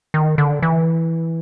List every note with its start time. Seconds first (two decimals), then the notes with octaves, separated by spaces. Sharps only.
0.14 D#3
0.38 D3
0.62 E3